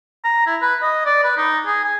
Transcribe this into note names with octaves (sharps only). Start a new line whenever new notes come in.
A#5
E4
B4
D#5
D5
B4
D#4
G#4
G#5